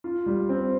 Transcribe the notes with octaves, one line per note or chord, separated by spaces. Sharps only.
F4
G3
C4